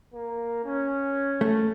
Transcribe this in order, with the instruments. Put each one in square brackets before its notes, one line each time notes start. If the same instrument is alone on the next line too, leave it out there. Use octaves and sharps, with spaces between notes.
[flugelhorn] A#3
C#4
[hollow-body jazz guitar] A3